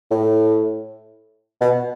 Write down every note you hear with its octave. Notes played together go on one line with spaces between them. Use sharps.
A2
B2